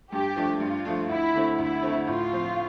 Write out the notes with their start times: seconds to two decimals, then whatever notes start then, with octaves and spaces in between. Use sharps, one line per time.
0.12 G2 G4
0.36 F3 A3 D4
0.60 G2 F4
0.85 F3 A3 D4
1.09 D2 E4
1.34 D3 A3 C4
1.58 D2 E4
1.83 D3 A3 C4
2.07 A2 F4
2.32 F3 C4